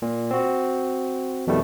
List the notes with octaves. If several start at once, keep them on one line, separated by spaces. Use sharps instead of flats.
A#2
C4 F#4
F2 B2 D#3 G3 A3